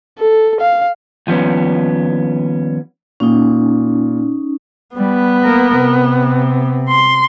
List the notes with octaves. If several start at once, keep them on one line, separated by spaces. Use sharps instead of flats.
A4
F5
D#2 F3 G3 B3 C#4
A#2 C#4 D#4
G3 B3
A#3 A#4
C3
C6